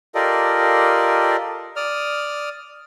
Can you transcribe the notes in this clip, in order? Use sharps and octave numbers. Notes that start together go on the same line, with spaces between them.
F4 G4 A4 A#4 D5 D#5
D5 D#6 F6